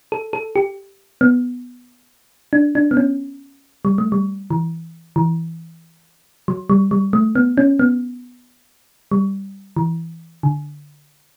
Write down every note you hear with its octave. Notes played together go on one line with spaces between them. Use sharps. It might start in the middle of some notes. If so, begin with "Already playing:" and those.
A4
A4
G4
B3
D4
D4
B3
C#4
G3
A3
G3
E3
E3
F#3
G3
G3
A3
B3
C#4
B3
G3
E3
D3